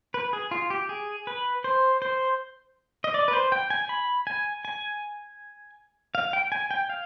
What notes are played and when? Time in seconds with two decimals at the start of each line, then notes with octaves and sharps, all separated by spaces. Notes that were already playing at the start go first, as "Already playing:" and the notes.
0.14 B4
0.33 G#4
0.51 F4
0.70 G4
0.89 G#4
1.27 B4
1.64 C5
2.02 C5
3.04 D#5
3.14 D5
3.28 B4
3.33 C5
3.52 G5
3.70 G#5
3.89 B5
4.27 G#5
4.65 G#5
6.15 F5
6.33 G5
6.52 G#5
6.71 G5
6.90 F5